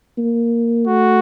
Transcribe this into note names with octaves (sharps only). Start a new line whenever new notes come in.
A#3
A3 F#4